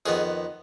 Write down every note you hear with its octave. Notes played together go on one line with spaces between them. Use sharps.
F2 D#3 B3 G#4